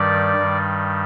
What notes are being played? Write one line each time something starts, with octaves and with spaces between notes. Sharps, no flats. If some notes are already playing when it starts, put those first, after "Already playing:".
Already playing: G2 D#3 G3 D5
G2 D#3 G3